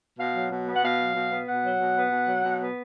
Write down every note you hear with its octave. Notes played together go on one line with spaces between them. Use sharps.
B2 F5
F#3
B2
B3
F#5
B2 F5
F#3
B2
B3
B2 F#5
F#3
B2
B3
B2
F#3
B2
B3